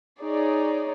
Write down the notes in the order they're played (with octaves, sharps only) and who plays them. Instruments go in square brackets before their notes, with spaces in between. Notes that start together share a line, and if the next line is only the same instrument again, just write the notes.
[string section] D#4 G#4 C#5 D5